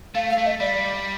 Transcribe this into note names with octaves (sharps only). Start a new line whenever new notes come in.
A3 F5
F5
A3
D#5
G3 D5